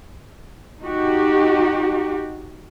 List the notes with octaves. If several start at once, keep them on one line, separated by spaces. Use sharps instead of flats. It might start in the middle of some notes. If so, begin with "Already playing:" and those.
D#4 F#4 G4